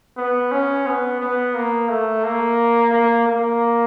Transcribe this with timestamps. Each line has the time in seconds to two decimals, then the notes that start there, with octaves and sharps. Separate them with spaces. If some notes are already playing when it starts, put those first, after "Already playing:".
0.17 B3
0.51 C#4
0.86 B3
1.20 B3
1.55 A#3
1.89 A3
2.24 A#3
2.93 A#3
3.27 A#3